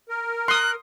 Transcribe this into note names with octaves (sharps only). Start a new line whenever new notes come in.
A#4
C6 D#6 F#6